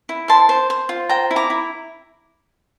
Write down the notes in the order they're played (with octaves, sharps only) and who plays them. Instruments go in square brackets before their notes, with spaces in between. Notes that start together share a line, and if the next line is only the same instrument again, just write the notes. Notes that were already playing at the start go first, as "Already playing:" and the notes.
[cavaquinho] E4
C5 A5 C6
C5
C5
F4
C5 G5 A#5
E4
A#5 D6
E4